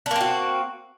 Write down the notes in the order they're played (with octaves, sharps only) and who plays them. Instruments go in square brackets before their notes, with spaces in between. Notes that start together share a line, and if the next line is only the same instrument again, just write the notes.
[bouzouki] D4
A#3
C4
F#4